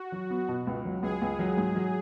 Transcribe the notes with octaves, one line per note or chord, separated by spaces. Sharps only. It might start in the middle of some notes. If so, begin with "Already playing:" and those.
Already playing: F#4
F#3
B3
B2
C#2
F#3
C#2 G#4
C#2
F#3
G#2
F#3